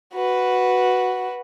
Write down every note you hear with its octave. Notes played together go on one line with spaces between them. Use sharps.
F#4 B4